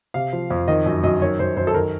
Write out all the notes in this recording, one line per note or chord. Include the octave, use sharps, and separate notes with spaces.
C3 F5
F3
F2
D#3 D#5
F#2
F#2 D#5
D#3 C#5
F#2 C5
F#2 C5
A4
D#3 A#4